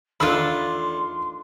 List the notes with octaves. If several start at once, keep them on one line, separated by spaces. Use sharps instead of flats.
E2 D#3 A3 D4 F4 B5 C6 E6